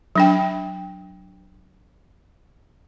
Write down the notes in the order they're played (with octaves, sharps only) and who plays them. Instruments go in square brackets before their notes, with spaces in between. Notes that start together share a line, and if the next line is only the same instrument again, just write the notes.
[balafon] F#3 D4 G5